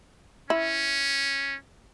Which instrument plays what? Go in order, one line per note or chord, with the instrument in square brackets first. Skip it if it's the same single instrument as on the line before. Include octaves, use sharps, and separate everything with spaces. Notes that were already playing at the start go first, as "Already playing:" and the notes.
[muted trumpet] C#4 [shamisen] E4